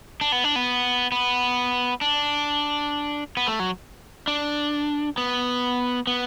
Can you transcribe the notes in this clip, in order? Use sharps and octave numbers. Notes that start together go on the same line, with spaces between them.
D4
B3
D4
B3
B3
D4
B3
A3
F#3
D4
B3
B3